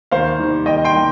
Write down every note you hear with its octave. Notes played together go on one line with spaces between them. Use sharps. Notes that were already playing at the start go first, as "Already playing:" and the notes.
D#2 C5 F5
D#3 G3
D#2 D#5 G5
G5 C6
D#3 G3